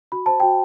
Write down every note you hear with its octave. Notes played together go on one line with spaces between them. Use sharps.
F#4 B5
C5 A5
F#4 G5